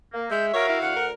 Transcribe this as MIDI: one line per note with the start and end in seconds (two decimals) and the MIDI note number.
0.13 0.27 58
0.31 0.50 56
0.31 0.77 76
0.31 0.48 88
0.31 0.46 91
0.54 0.98 66
0.54 0.81 70
0.54 0.68 73
0.54 0.98 77
0.69 0.91 64
0.82 1.11 38
0.82 1.05 78
0.82 1.11 89
0.96 1.13 70